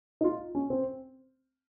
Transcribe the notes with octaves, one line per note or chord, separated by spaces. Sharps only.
D#4
F4
C#4
C4